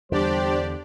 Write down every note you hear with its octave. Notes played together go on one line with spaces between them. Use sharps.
E2 D3 G3 D4 G4 C5 D5